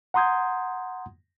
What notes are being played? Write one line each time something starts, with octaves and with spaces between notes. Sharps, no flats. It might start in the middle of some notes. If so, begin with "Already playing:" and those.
F#5 A#5 C6 D#6 G6 G#6